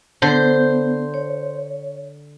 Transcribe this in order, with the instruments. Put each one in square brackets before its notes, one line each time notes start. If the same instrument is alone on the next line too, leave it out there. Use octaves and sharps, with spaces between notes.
[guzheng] D3 [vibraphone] B3 [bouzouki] C5
[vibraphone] C#5